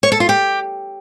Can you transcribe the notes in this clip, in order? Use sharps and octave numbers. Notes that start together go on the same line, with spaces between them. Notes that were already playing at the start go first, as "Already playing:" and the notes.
C#5
A4
F4
G4